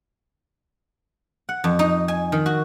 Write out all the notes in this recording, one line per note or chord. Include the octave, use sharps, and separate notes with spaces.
F#5
F2
D#4
G#5
D#3
F#4